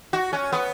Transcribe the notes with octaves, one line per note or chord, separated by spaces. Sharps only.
F#4
C#4
B3